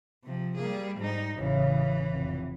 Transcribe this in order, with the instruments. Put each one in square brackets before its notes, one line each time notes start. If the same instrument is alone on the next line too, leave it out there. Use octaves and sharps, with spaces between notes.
[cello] C3 F3
[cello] G3 G#4 [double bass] A#3
[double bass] G#2 [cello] G3 D#4
[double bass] A1 C#3 [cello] E3
[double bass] F1